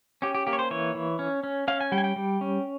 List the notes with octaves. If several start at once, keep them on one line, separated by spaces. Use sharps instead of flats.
C#4 G4
G4
A#3 G4
C#5
C5
E3 C#5
E3
C#4
C#4
C#4 F5
G#5
G3 G5
G#5
G5
G3
C#4